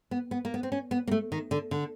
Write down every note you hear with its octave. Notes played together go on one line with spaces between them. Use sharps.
B3
B3
A#3
B3
C4
C#4
B3
A#3
A3
D#3
D3
D3